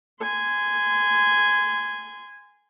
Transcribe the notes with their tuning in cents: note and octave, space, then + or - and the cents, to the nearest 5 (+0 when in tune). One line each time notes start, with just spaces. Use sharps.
G#5 +0 C6 -30